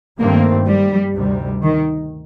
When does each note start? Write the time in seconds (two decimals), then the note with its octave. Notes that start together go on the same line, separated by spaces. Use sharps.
0.19 G2 D#3 A3 A#3 C4
0.67 G3
1.15 D2 C3 D#3 G3
1.63 D#3